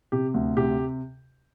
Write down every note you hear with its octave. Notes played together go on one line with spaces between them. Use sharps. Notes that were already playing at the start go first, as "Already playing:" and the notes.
C3 G4
D2
C3 G4